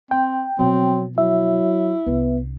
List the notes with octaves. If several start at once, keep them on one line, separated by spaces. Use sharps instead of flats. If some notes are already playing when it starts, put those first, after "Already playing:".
C4 G5
B2 F3 F#3 C4
F#3 E4 E5
C2 B3 D4